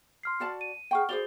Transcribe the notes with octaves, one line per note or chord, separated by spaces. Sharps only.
C6 F6 C7
F#4 D5 A5
D#7
G#4 F#5 G5 C#6 F6
F#4 G#4 C5 D5 F7 G7